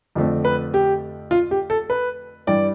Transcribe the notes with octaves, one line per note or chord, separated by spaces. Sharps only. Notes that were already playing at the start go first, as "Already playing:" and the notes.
F2 D3 F3 A3 C4
B4
G4
F4
G4
A4
B4
G2 E3 G3 D5